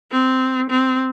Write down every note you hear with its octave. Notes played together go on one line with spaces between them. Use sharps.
C4
C4